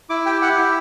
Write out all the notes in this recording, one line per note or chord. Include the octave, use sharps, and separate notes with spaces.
E4 D6
G4 G5
G4 F#5
E4